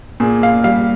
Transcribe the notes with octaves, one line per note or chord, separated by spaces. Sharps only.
A#2 G#4
F5
G3 F5